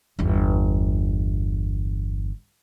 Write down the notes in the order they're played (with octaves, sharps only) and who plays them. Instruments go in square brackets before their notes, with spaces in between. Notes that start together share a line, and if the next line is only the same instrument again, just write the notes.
[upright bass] G1 E2